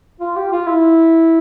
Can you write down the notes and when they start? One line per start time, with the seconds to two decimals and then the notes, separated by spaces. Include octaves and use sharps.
0.20 F4
0.36 G4
0.52 F4
0.67 E4